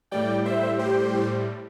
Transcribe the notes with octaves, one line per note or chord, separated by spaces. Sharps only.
A2 G3 D5 G5
C5 E5
G4 C5